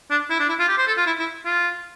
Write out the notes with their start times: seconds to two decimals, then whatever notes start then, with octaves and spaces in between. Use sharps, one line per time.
0.11 D4
0.30 E4
0.40 D4
0.49 E4
0.59 F4
0.68 G4
0.78 C5
0.87 A4
0.97 F4
1.07 E4
1.19 E4
1.45 F4